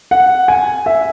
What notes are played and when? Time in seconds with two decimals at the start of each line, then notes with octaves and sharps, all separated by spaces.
0.11 F#5
0.48 G#5
0.86 E5